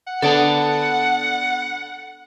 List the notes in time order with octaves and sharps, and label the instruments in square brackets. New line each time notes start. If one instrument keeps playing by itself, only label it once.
[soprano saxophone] F#5
[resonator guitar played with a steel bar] D3 B3 [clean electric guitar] A4 D5 A5